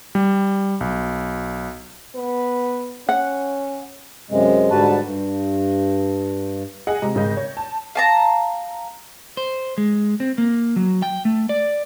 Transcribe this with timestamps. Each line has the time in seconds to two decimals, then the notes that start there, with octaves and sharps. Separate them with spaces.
0.15 G3
0.81 B1
2.15 B3
3.09 C#4 F#5
4.30 F#2 C3 G#3
4.70 G#2 D3 G3 F#4 B4 A5
5.04 G2
6.87 G#4 D#5 F#5
7.02 C3 G#3 A#5
7.15 G#1 C#3 G#3 G6 A#6
7.37 C#5
7.57 A5
7.95 F5 A5 A#5
9.37 C5
9.78 G#3
10.20 C4
10.38 A#3
10.76 F#3
11.02 G5
11.25 A3
11.49 D5